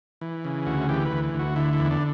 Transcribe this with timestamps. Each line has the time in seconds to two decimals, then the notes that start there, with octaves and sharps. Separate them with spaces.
0.21 E3
0.44 C#3
0.66 D2 F#4
0.89 E3 G4
1.06 B4
1.11 D2
1.34 D2
1.39 F#4
1.56 D3 E4
1.73 E4
1.79 E2
1.90 D4